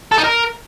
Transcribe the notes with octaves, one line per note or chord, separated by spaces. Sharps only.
A4
D#4
A#4